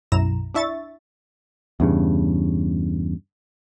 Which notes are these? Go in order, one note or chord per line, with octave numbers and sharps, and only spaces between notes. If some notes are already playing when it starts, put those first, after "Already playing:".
B1 F#2 E4 A#5 E7
D4 E4 E5 C#6 A6
E2 G2 C#3